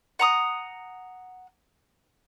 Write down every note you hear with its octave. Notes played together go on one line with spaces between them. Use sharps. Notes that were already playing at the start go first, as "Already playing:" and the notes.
F#5 A#5 D#6